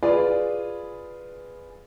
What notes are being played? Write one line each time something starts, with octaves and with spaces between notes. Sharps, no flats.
F4 G#4 B4 D5